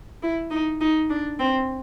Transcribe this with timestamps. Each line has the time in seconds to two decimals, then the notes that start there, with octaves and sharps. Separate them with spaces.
0.22 E4
0.51 D#4
0.81 D#4
1.10 D4
1.39 C4